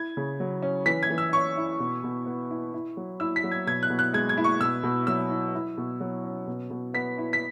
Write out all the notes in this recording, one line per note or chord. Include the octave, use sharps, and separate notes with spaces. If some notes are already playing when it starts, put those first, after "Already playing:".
Already playing: E4 G#6
C#3
F#3
C#4
E3 B6
G#6
E3
E6
C#4 C#6
E4
B2
B2
B3
E4
E4
F#3
E4 E6
B6
F#3
G#6
B2 G#6
F#6
B2
F#6
G#3 G#6
G#6
E4
C#6
B2 E6
B2
F#3 E6
E4
E4
B2
F#3
C#4
B2
B2
B3 B6
E4
B6